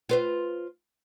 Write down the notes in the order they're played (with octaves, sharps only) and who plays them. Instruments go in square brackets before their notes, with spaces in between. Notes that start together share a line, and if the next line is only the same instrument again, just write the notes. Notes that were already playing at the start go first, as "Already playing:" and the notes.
[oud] F4 B4 C5